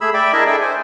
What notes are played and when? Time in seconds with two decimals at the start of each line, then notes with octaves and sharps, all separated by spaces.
0.01 A3 G#4 B5 E6
0.14 D5 E5 G5 B5 D6
0.33 D4 E4 G#4 A#4 D#5 E5
0.47 G#4 A4 D5 E5 G5
0.61 C5 G#5